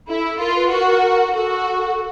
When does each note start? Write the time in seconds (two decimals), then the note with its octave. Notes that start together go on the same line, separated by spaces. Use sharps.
0.08 E4 A4
0.39 F4 A#4
0.55 B4
0.71 F#4 A#4
0.87 A#4
1.02 A#4
1.33 F#4 A4